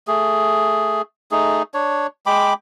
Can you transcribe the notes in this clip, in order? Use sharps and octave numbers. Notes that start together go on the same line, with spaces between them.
A3 G#4
A3 D#4 G#4
D4 C#5
G#3 G5 B5 D6